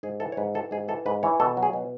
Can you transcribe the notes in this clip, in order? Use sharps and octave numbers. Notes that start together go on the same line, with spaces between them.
G#2 G#4
E3 A4
C#5
G#2 B4
E3 A4
G#2 G#4
E3 A4
G#2 B4
E3 C#5
B2 A4
F#3
G#4
B2